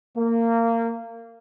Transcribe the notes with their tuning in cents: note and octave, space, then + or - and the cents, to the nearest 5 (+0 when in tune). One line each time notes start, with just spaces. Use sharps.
A#3 -20